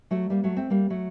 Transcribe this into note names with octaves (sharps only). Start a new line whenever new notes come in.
F#3 A3
G3 A#3
F#3 A3
A3 C4
G3 A#3
F#3 A3